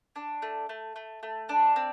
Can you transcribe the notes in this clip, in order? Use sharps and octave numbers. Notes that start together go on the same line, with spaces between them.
D4
A3
A3
A3
A3
D4
C4